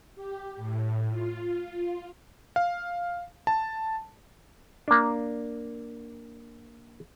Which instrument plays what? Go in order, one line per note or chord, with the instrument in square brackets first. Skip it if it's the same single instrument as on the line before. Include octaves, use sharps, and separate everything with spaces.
[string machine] G4
A2
F4
[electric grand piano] F5
A5
[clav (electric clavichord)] A#3 D4